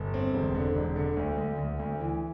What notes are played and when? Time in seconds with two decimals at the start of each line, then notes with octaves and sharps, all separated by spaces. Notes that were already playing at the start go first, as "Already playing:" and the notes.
Already playing: G1
0.14 C4
0.34 E1
0.55 D3
0.75 E1
0.96 D3
1.17 D2
1.38 D2
1.58 D2
1.79 D2
2.00 E3